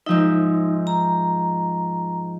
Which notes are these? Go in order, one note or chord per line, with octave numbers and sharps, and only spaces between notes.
G#2 F3 D#4 E5
A#5